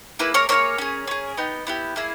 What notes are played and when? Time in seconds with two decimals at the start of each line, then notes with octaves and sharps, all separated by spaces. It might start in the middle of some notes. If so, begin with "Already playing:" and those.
0.19 A#3 E4 G#4 B4
0.34 A#4 C#5
0.49 A#3 E4 G#4 A#4 C#5
0.78 C#4 G#4
1.08 C#4 G#4
1.37 B3 D#4 G4
1.67 B3 E4 G4
1.96 A#3 E4 G#4